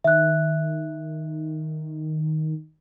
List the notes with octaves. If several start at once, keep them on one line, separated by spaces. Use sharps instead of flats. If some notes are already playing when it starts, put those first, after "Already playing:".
D#3 E5 F#6